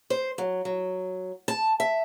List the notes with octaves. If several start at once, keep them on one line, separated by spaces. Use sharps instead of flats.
C5
F#3
F#3
A5
E5